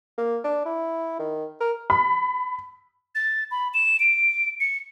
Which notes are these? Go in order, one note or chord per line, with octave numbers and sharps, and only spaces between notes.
A#3
D4
E4
D#3
A#4
B5
A6
B5
E7
D7
C#7